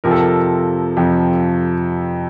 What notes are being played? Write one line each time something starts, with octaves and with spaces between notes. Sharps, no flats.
F2 C3 F3 A#4
A4
A#4
F2 C3 F3